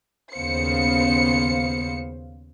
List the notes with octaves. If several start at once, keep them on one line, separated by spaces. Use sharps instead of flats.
D#2 C#3 B3 C5 F5 C#7